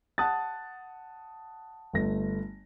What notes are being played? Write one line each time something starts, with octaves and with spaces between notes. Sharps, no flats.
F#5 A5 D#6 F#6 A6
G1 A3 A#6